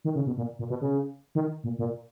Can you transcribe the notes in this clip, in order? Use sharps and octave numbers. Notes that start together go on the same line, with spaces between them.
D#3
C#3
B2
A#2
A#2
B2
C#3
D#3
A#2
A#2